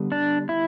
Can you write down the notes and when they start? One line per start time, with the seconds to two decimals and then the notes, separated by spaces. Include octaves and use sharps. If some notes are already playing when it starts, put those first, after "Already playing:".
Already playing: D3 G3 B3
0.12 D4
0.49 E4